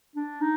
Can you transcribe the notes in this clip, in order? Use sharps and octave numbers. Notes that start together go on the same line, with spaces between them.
D4
D#4